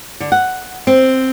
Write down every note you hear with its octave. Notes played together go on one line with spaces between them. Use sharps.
D3
F#5
C4